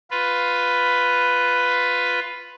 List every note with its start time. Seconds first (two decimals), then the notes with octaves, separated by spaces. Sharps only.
0.11 F4 B4